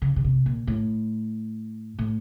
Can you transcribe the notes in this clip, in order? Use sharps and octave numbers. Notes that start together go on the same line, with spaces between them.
C#3
C#3
C3
A#2
A2
A2